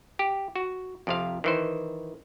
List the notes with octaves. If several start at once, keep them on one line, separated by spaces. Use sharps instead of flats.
G4
F#4
F2 C3 F5
D#3 E3 C5